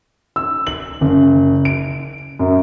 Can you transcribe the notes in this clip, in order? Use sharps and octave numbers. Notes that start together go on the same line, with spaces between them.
E6
F#7
F#1
D7
F#2